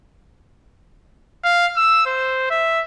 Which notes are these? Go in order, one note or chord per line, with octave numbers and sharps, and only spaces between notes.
F5
E6
C5
E5